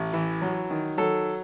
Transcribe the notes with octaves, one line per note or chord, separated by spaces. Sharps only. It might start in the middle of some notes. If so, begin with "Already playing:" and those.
Already playing: A1
E3
F#3
D#3
F#3 A4